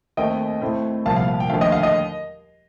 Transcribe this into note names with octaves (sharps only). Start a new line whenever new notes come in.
D#2 D#3 A3 C4 D#5 G5
A2 A3 C4
C2 A#2 F3 F5 A5
F5
F5
G5
D#2 D3 F3 A3 F5
D#5 G5
F5
D#5